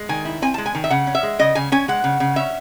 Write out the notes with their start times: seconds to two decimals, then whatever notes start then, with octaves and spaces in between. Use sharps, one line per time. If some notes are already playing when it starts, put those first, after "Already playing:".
Already playing: G#3
0.09 D#3 G#5
0.25 E4
0.42 C4 G#5
0.54 G#3 A5
0.66 G#5
0.75 D#3
0.84 E5
0.90 C#3 F#5
1.07 C#4
1.15 E5
1.23 G#3
1.39 C#3 D#5
1.55 C#3 G#5
1.72 C#4 G#5
1.88 G#3 F#5
2.04 C#3
2.20 C#3
2.36 C#4 E5